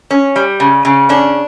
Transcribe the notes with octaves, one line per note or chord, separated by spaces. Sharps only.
C#4
G3
C#3
C#3
C#4 D4